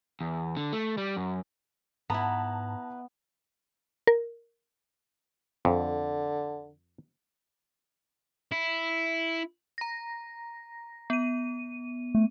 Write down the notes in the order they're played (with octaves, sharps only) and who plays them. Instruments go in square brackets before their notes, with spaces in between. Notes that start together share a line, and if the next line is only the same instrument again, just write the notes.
[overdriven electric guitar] E2
D3
A3
G3
F#2
[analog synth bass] G#2 [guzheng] B3 [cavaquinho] E4 B4 [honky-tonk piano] A5 A#5
[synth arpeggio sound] A#4
[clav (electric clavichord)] F2 [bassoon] D3
[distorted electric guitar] E4
[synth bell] A#5 A#6
B3 D#7
[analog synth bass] A3